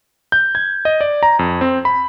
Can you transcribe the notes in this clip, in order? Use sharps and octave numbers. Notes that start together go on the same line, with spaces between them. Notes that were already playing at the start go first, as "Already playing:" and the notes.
G6
G#6
D#5
D5
A#5
F2
C4
B5